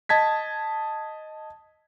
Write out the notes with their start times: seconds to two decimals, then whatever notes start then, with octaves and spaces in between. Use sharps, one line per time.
0.09 D#5 A5 G#6 B6